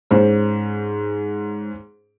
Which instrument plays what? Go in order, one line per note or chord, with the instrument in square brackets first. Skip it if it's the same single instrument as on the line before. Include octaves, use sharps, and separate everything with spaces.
[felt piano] G#2 C#4 C5